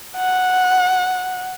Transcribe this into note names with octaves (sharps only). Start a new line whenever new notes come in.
F#5